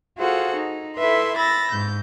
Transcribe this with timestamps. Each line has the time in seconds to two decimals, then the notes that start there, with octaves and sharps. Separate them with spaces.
0.19 F4 F#4 G#4 A4 C5 F#5
0.57 D#4
0.96 E4 A4 B4 E5 C6
1.37 B5 E6 A6 A#6
1.72 G#2 G6